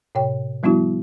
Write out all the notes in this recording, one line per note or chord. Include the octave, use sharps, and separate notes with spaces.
A2 C3 C#5 G5
F3 G3 B3 D4 E4 F#4